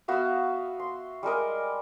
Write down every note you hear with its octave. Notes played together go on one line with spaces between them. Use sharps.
B3 F#4 E5 F5
C6
G3 G#3 A#4 D#5